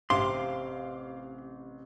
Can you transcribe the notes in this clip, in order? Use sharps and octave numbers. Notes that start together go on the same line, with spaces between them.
A1 C3 F5 C6 D6